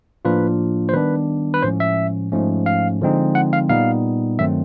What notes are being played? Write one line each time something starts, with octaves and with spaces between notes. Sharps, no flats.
A2 F3 A#3 D4 F4 B4
C5
D#3 G3 B3 D4 B4
B4
A2 F3 G#3 C#4 C5
E5
G#2 F3 A3 C#4
F5
D3 F3 G#3 C4 D#4
F#5
F5
A#2 G3 B3 D#4 F5
G2 D#3 F#3 A3 C4 E5